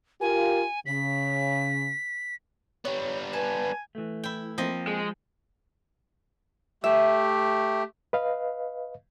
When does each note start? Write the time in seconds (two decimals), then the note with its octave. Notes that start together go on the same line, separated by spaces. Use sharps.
0.21 F4 G4 A#4 G#5
0.86 C#3 B6
2.85 G3 B3 C#5
3.33 B4 G#5 A5
3.95 E3 A3
4.23 E4 G5
4.58 F3 A#3 C4 D#5 G5
4.87 G#3
6.84 A3 G4 E5
8.13 B4 D#5 F5